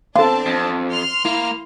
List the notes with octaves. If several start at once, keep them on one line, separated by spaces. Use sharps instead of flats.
B3 C4 D4 F4 A4 A5
F2
C6 F6
A#3 E4